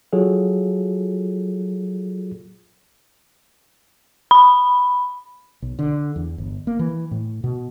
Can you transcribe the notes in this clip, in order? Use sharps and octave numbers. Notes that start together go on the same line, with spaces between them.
F#3 F4 G#4 A4
B5
B1
D3
E2
G1
A#3
E3
A2
B2